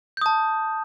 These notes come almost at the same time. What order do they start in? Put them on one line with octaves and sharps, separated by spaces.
G6 D#6 A5